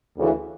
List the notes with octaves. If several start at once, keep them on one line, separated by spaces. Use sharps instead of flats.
D2 C#3 E3